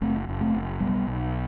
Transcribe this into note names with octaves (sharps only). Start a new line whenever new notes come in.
F#1 A3 C4
F#1
A3 C4
F#1
B1 G3 B3
B1